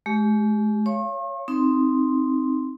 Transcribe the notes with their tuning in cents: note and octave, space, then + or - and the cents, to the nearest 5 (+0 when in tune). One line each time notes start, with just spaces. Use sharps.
G#3 +40 G4 +0
C#5 +0 F5 -30 C#6 -45
C4 +0 D#4 +0 C6 +0